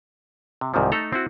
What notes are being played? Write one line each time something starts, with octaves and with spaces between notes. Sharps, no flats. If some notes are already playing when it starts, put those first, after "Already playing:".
C3
C2 G#2 C3 D#3 F3
A3 D#4 A4 A#5
C4 E4 F#4